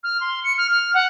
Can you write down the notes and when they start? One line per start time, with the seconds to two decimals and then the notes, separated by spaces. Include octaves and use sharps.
0.03 F6
0.21 C6
0.44 C#7
0.57 F6
0.71 F6
0.94 F#5